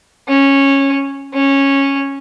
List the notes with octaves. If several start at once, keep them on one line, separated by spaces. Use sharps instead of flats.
C#4
C#4